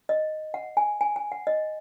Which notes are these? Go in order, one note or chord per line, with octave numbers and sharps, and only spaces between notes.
D#5
F#5
G#5
G#5
G#5
F#5
D#5